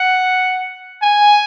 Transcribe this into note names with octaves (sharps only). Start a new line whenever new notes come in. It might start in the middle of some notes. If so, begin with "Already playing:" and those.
Already playing: F#5
G#5